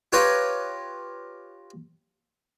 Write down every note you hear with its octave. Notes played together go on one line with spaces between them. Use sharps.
F4 G4 B4 C#5 G5 A#5